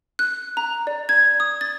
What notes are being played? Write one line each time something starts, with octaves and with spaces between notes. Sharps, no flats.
F#6
A#5
D5
G#6
D#6
A6